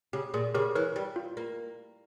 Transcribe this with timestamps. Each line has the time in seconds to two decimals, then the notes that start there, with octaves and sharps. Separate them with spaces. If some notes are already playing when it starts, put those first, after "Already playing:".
0.13 C#3 G4
0.34 A#2 G#4
0.54 C#3 G4 A#4
0.75 E3 A#4 C#5
0.96 G3
1.16 F4
1.37 A#3